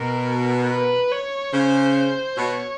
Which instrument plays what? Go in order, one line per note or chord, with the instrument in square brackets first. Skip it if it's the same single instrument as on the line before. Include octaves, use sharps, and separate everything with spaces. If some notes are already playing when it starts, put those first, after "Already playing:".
Already playing: [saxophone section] B2 [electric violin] A#4
[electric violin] B4
C#5
[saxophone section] C#3 [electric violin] C5
[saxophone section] B2 [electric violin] C#5